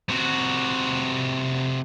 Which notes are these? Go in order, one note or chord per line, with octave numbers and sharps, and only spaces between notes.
C3 F#4